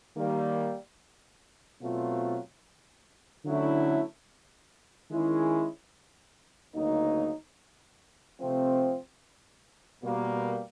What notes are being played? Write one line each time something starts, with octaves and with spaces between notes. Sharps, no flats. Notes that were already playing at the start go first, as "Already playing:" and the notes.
D#3 G3 A#3
B2 F#3 A3 C4 F4
D3 F#3 A3 C#4 E4
D#3 G#3 C#4 E4 G#4
D2 C#3 F#3 A#3 D#4
C3 F3 A3 C4
B2 G3 A#3